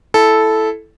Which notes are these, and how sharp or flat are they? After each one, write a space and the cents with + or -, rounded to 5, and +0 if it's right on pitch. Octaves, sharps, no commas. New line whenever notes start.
E4 +0 A4 -10